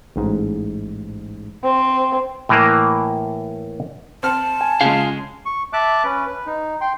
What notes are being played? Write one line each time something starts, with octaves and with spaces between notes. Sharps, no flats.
A1 G#2
C4
A2 E3 A#3
C4 A5 F6
G#5
C#3 G#3 F4 G#4 F5
C#6
E5 A5 D6 F#6
C#4 B4
B4
D#4
G5 C6